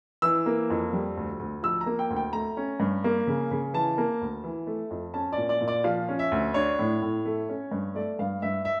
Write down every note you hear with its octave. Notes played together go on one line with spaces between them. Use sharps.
E3 E6
A#3
F2
G3
D2
D2
F3 E6
A#5
A#3
G5
D2
G5
A3 A#5
C#4
G2
A#3
C#3
C#3
E3 A5
A#3
D2
E3
A3
F2
C#4 A5
A#2 D5
D5
A#2
D5
F3 F5
C#4
E5
D2
D4 C#5
A2
A2
A3
C#4
G2
A3 D5
G2 F5
G2 E5
E5